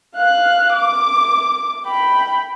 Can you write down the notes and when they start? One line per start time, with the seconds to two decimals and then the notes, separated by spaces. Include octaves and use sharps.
0.16 F5 F#6
0.73 D6
1.86 G5 B5